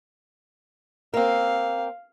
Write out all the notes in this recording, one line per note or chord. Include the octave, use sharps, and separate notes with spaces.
A#3 C4 F5